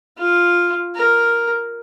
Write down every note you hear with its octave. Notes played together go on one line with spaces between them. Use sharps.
F4
A#4